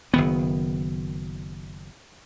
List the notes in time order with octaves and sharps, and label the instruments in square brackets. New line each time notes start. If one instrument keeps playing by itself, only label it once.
[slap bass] F#1 D#3 B3